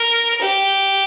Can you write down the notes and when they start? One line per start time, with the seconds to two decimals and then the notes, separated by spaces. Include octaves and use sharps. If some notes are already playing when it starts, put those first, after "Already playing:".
Already playing: A#4
0.41 G4